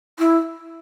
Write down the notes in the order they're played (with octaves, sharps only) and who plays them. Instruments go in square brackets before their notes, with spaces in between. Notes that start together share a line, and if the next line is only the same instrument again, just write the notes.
[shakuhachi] E4